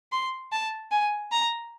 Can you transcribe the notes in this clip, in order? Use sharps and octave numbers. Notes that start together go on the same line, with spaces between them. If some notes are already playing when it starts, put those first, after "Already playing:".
C6
A5
G#5
A#5